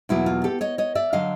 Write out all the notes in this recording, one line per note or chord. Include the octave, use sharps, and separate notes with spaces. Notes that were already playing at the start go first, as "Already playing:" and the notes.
E2 B2 F#3 A#3 E4
F4
G4 A4
C#5 D#5
C#5 D#5
D5 E5
D3 F#3 D#5 F5